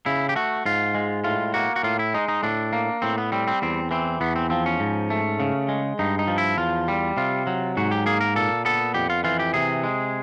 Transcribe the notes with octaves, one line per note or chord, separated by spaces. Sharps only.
C#3 E4
G4
A3 F#4
G#2 F4
G#3
A2 F4
A#3 F#4
F#4
A2 F4
E4
G#3 D#4
D#4
A2 D4
A#3
A2 C4
B3
G3 C4
C4
E2 C4
E3 C4
E2 B3
C4
F3 C4
C#4
G#2
A3
C#3
G#3
G2 D#4
D#4
F3
E4
E2 F4
G3
C3 F4
F#3
G#2 F#4
G4
A#3 G#4
A#4
A#2 A4
B3 A4
F2 G4
F4
E3 F4
G4
C3 G#4
G#3